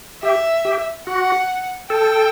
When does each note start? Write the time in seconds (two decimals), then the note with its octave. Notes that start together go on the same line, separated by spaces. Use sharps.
0.23 G4 E5
0.65 G4
1.07 F#4 F#5
1.90 A4 G5